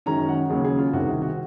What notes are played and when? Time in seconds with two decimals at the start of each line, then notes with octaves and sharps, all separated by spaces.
0.06 F#2 D#3 G#3 C#4 A#5
0.29 F#5
0.50 D#2 C#3 F#3 C#4 G#4
0.64 G#4
0.79 F4
0.93 C2 C3 D#3 F#4
1.07 G#4
1.22 F#4